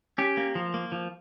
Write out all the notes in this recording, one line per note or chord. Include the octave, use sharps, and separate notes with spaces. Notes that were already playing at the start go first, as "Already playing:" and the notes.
C#4 G4
A#3
F3
A#3
F3